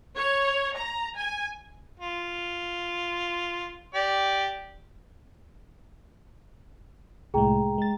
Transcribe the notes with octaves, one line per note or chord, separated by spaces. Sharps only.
C#5
A#5
G#5
F4
G4 D5
C2 A2 G#3 G#4 G5 A#5
G#3 A6